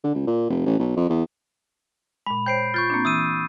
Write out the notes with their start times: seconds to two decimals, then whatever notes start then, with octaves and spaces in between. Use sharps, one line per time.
0.04 D3
0.15 C#2
0.27 A#2
0.50 F1
0.66 A1
0.79 B1
0.96 F2
1.09 E2
2.26 A#2 G#3 B5
2.46 C5 C#5 G5 G6 C7 D7
2.74 F4 C#6 G6 A6
2.90 A#3 C4 D4
3.05 E3 D#6 E6 D#7